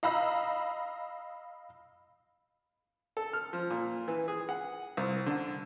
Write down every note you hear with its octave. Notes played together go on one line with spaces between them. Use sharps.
D#5 F5 A#5 B5 E6
A4
F6
F3
A#2
E3
G#4
F#5
C2
D3